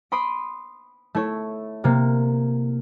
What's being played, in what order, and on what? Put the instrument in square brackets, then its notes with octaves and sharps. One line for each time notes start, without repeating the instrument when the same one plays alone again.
[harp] B5 C6 D#6 D7
A3 E4 C#5
C3 A#3